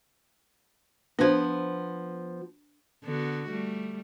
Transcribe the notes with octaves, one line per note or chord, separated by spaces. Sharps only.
F3 B3 D4 C5
D3 B3 F#4
G3 A3